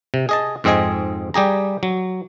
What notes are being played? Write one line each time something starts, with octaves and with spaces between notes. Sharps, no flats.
C3
G#4 D#5 A5
F2 G#2 C4 G#4 D#5 G#5
G3 G4 G#4 A#5
F#3